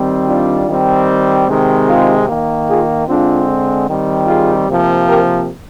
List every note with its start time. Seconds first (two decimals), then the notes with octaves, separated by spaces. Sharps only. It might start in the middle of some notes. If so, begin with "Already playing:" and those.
Already playing: D#3 G3 C4
0.28 D4 F4
0.68 D#3 G3 C4
1.48 C3 D#3 G#3 C4
1.87 F4 G#4
2.28 D#3 A#3
2.68 F4 G#4
3.07 D3 G#3 C4 D4 F4
3.88 D#3 G3 C4
4.27 F4 G#4
4.68 C3 F3 A#3
5.07 G4 A#4